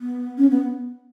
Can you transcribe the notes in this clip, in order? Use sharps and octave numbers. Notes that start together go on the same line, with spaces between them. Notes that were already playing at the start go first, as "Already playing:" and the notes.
B3
C#4
B3